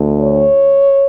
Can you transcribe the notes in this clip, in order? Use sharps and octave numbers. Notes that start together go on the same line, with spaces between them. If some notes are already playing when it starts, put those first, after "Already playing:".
Already playing: D2 D3
C#5